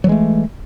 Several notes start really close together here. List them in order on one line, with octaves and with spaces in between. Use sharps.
F#3 E3 G#3 A3